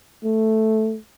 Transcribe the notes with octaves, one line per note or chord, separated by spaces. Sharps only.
A3